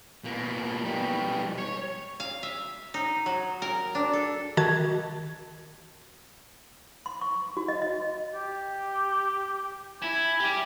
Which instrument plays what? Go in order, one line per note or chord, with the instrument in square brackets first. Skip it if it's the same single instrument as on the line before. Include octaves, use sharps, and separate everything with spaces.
[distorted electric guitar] B2 A#3
B2 G3
C#5
[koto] F5
E5
D#4
F#3
A#4
D4
A4
[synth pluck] D#3 F#4 A5 G#6
[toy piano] C6
C#6
F#4
D#5
D#5
[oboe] G4
[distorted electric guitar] E4 [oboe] G#5
[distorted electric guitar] G4 D5